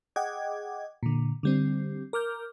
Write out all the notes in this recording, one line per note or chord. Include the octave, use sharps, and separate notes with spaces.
G#4 D#5 F#5 G5 D6 G#6
A#2 D3
D3 G3 C4
A#4 D6 F6 G6